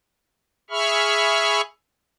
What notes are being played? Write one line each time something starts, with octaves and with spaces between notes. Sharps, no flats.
G#4 E5 B5 C#6 F6